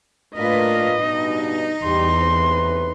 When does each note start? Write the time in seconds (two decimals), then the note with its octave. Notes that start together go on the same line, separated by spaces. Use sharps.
0.36 A2 A#3 D4 F4 A#4 B4 D#5
1.00 G2 B2 D#4
1.84 E2 G3 G4 C6
2.21 A2 C3 B4